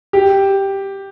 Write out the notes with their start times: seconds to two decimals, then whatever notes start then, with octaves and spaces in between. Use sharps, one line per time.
0.13 G4